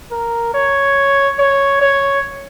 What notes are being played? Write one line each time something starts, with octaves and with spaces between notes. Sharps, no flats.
A#4
C#5
C#5
C#5